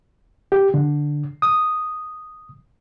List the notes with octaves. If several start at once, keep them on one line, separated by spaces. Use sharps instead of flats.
G4
D3
D#6